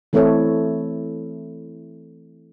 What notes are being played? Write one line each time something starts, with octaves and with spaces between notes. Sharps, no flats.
E3 A3 C4 E4 A4 C#5